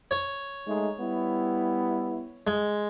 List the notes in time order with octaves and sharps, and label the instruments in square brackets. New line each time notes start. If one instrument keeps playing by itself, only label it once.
[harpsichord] C#5
[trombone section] G#3 A3 D#4
G3 B3 E4
[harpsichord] G#3